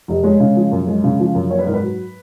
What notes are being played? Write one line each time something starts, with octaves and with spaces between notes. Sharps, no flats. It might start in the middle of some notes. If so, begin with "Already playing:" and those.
F1
G#3 C#5
C#3
F3
F#2
G#3
C#3
F3
F#2
A#3 C#5
B4
G#2 A#4
B4
F#3